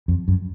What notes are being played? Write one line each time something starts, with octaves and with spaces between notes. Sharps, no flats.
F2
F#2